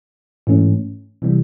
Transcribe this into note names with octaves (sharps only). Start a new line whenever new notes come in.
G#2 E3 A3 C#4
C3 E3 G3